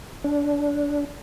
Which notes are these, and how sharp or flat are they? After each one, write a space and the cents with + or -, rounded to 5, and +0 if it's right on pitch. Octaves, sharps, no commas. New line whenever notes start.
D4 -20